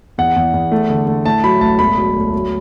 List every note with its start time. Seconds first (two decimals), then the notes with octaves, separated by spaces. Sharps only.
0.18 E2 F#5
0.36 E2
0.54 E2
0.71 A3
0.90 D3
1.07 A3
1.25 A2 A5
1.44 F#3 B5
1.61 A1 A5
1.79 E1 B5
1.98 F#3
2.15 D2
2.32 F#3